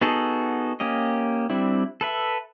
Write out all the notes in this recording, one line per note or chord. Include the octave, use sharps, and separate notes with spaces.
B3 D#4 F#4 G#4 A4
A#3 C#4 G4 D#5
G3 C4 D4 E4
A4 B4 E5